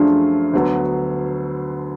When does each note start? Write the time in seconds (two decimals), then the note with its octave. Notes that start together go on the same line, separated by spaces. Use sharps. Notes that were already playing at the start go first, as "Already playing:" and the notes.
Already playing: F#2 F3 A3 D4 F4 G#4
0.53 D2 D3 F#3 B3